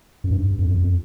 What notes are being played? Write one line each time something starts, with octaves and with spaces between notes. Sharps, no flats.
F#2
G2
F2
F2